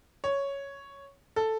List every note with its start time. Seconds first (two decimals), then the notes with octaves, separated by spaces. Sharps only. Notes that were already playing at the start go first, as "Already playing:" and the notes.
0.24 C#5
1.36 A4